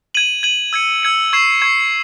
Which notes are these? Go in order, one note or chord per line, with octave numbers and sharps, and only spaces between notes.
G#6 D#7 F#7
G#6 D#7 F#7
E6 G#6 C#7
E6 G#6 C#7
C#6 G#6 C7 E7
C#6 G#6 C7 E7